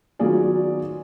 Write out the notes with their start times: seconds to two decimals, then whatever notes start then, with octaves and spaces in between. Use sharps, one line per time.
0.19 D#3 F#3 B3 F4 G#4 D5